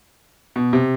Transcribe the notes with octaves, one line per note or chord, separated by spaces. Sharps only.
B2
C3